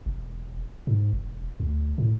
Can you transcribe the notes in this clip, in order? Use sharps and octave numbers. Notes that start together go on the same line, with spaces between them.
E1
G#2
E1
D2
A2